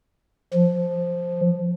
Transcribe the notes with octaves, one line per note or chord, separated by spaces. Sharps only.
F3